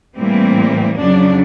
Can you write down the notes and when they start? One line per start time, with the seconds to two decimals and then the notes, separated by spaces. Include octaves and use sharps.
0.16 A2 E3 G3 A#3 C4
0.96 F2 C#3 F#3 D4